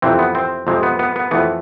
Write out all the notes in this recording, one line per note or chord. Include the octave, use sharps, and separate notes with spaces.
F2 C3 E3 C4
B3
C4
F2 C3 G#3 C4
B3
B3
B3
F2 E3 A3 B3